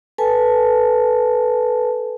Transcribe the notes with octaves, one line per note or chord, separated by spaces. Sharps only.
A4 B4 G#5 A5